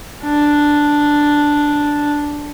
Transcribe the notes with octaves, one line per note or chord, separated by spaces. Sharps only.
D4